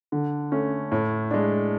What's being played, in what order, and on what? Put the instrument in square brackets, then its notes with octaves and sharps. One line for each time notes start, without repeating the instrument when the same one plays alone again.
[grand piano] D3
A3 C#4
A2
G#3 D4